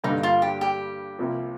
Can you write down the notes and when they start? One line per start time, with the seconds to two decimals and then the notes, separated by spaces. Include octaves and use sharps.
0.04 G2 D3 G3 A#3 D#4
0.23 F4
0.42 G4
0.61 G4
1.19 C2 C3 F3 A#3